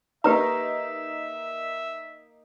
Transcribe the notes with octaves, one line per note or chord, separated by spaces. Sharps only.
A#3 D#4 G4 B4 E5 A#5